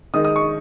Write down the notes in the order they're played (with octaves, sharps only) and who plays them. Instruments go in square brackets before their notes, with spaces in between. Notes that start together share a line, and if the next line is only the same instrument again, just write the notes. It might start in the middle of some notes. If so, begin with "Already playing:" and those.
[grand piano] D#3 G#3 D#4 D#6
D#6
C#6